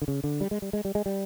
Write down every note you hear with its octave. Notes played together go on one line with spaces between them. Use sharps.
D3
C#3
D3
G3
G#3
G3
G#3
G3
G#3
G3